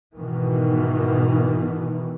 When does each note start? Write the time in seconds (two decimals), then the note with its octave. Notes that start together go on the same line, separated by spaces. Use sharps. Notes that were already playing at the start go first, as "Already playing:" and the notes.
0.16 G#2 B2 D#3 E3